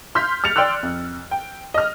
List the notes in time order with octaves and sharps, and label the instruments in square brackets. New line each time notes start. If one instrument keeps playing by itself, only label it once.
[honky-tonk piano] C6 F6 G6 B6
F6 A6 C#7 F7
D5 G5 C6 E6 F#6
F2
G5
D#5 F6